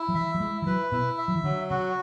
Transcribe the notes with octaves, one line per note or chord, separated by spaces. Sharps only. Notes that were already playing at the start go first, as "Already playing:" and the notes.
Already playing: E4
F#3
E3 E5
F#3
G#3 E4
E3
F#3 B4
B2 E4
E5
F#3
E3
D3 F#3
C#3 F#4